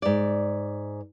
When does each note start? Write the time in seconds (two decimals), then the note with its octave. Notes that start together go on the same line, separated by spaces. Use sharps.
0.02 G#2 D5